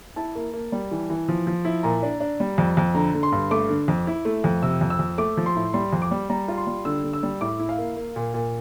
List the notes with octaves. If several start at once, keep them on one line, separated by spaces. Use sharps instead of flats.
E4 A5
A#3
A#3
G3
E3
E3
F3
F3
E4
A#2 A#5
D4
D4
G3
F2
F2
D3 A#5
D3
C6
G2
A3 D6
D3
F2
E4
A3
F2
C3 E6
F2
E6
F2
A3 D6
F3
C6
A2
G3 C6
F2
D6
G3
G3 A#5
F4
C6
G3
D3 E6
D3
E6
G3
A2 D6
E4
F5
A#3
A#3
A#2
A#2